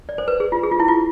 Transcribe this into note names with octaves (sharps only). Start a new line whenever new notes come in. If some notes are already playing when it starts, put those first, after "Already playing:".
D5
C5
B4
G#4
F4
G#4
F4
E4
F4